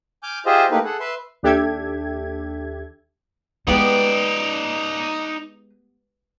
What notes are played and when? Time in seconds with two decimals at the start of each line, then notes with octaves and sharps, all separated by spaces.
0.23 G#5 D6 F6 G6
0.46 F4 G4 G#4 C5 D#5 E5
0.71 A3 A#3 D#4 E4 G4 B4
0.85 G#4 A4 F#5
1.00 B4 E5 C6
1.43 D#2 D4 G4 A4 E5 G#6
3.67 G#3 B3 D#4 G4 B4 D5